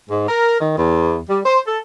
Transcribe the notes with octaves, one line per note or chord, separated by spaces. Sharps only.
G#2
A#4
D#3
E2
G3
C5
A4